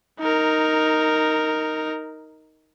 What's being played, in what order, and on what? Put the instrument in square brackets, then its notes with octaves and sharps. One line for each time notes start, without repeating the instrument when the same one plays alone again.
[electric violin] D#4 A#4